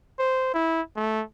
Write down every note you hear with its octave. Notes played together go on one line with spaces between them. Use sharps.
C5
E4
A3